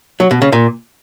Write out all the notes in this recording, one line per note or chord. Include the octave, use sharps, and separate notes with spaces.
F#3
B2
C#3
A#2